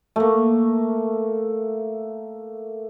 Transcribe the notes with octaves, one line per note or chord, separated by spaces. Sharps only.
A3 A#3